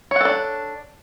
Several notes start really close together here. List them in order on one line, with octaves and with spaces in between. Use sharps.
C#5 F#5 A4 D4